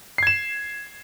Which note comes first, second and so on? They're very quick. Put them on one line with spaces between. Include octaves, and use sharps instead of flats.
C7 G#6 E7